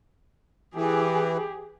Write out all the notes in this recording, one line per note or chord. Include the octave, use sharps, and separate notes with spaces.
E3 G4 G#4